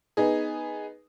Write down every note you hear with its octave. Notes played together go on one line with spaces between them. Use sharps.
B3 D#4 G#4